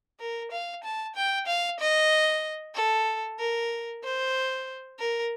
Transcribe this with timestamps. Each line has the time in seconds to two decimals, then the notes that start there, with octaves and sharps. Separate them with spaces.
0.20 A#4
0.51 F5
0.84 A5
1.15 G5
1.47 F5
1.80 D#5
2.75 A4
3.39 A#4
4.04 C5
4.99 A#4